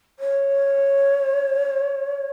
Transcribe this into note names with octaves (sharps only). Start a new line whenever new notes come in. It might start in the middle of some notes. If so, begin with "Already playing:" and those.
C#5